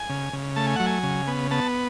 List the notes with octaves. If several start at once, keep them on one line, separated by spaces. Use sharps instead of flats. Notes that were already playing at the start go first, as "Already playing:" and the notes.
Already playing: G#5
C#3
C#3
A3 A5
G#5
F#3 F#5
G#5
C#3
B3
B3 A5